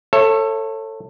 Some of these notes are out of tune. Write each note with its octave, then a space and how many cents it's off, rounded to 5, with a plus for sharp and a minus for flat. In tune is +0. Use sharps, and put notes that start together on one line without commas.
A4 +20 C#5 -25 E5 +20